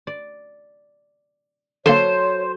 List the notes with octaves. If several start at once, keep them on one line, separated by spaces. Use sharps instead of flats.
D5
D3 F#3 A#3 A4 C5 C#5 C6